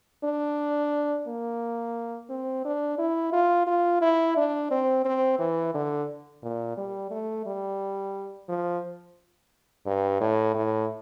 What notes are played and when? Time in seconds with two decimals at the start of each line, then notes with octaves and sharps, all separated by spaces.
0.24 D4
1.27 A#3
2.30 C4
2.65 D4
2.99 E4
3.33 F4
3.67 F4
4.01 E4
4.37 D4
4.71 C4
5.05 C4
5.39 E3
5.74 D3
6.43 A#2
6.77 G3
7.11 A3
7.46 G3
8.49 F3
9.86 G2
10.21 A2
10.55 A2